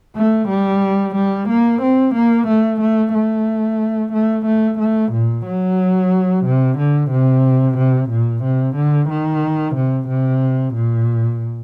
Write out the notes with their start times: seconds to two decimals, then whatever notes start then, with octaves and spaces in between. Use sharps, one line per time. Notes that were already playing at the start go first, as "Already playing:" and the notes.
0.17 A3
0.49 G3
1.15 G3
1.49 A#3
1.82 C4
2.15 A#3
2.47 A3
2.81 A3
3.14 A3
4.13 A3
4.46 A3
4.79 A3
5.13 A#2
5.46 F#3
6.45 C3
6.78 D3
7.11 C3
7.78 C3
8.10 A#2
8.43 C3
8.76 D3
9.10 D#3
9.76 C3
10.08 C3
10.75 A#2